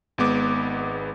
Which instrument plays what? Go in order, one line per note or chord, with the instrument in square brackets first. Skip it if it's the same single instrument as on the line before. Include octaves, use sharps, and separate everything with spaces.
[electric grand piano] G#1 G#3 B3 D6